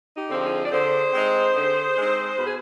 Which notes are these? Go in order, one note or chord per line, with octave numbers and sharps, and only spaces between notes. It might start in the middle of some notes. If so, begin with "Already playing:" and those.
D#4 G4
D3 F3 G#3 C4
F4 G#4
D5
D3 G#4 C5
G#3 C4 D#4
D3
G#3 C4 D#4
B2 B4
G#4